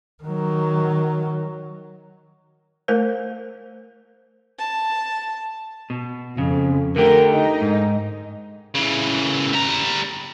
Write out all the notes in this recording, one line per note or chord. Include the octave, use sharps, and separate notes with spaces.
D#3 F#3
A3 A#4 C5
A5
B2
F2 C#3
D3 A3 G4 A#4
D#4
G#2
C#3 E3
G3 A#5